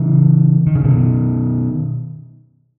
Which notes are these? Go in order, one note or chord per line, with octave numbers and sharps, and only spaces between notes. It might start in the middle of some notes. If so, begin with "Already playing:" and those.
Already playing: C#3 E3
D#3
C#3
B2 D#3